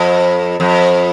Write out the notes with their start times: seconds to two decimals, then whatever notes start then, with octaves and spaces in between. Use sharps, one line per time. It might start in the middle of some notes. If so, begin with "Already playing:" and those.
Already playing: F2
0.60 F2